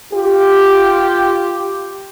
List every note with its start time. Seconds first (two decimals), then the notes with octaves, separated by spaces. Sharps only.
0.13 F4 G4